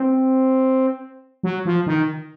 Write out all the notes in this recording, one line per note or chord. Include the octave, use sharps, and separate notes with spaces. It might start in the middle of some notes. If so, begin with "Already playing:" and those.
Already playing: C4
F#3
F3
D#3